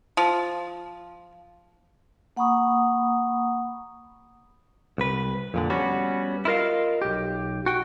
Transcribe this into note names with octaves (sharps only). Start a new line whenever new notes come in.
F3
A#3 F#5 A#5 B5 C#6 D#6
C2 B4
F2 A#2 D3
G3 B3 C#4 F#4
E4 F4 A#4 D#5 F5
B1 G4
F#4 G5